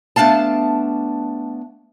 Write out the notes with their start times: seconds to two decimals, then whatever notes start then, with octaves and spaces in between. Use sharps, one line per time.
0.16 A3 B3 D4 F5 A5